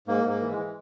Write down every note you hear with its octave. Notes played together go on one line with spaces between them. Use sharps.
G#2 A#3
G#2 A#3
E3
G#3
E3